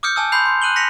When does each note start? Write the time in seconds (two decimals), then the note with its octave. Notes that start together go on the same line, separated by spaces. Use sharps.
0.03 D6 D#6 F6 G6 C#7
0.16 G#5 A5 D#6 E6
0.32 B5 C6 G6 C7 F7
0.46 C6
0.62 E6 F#6 D#7 F#7 G7
0.76 F#6 A#6 B6 C#7 F7